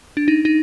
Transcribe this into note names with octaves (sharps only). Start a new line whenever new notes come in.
D4
D#4
D#4